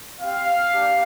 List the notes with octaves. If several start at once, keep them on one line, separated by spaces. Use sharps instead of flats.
C4 G4 F5
A#3 D4 G4